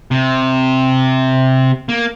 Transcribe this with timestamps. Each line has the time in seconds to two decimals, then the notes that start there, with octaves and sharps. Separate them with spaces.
0.11 C3
1.89 A#3